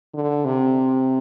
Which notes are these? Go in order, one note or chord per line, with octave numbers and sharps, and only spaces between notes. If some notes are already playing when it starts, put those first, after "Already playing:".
D3
C3